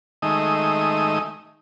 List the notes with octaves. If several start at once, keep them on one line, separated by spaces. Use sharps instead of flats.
D#3 G#3 A3 D#4 E5 D#6